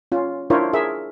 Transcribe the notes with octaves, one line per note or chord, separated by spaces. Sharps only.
C#4 F4
D4 E4 F4 A#4 C5 C#5
G#4 A#4 E5